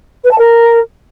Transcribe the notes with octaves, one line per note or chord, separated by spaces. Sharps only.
B4
A5
A#4